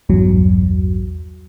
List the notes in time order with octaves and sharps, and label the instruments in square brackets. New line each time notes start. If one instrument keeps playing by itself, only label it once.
[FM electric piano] A#1 E2 G2 F#3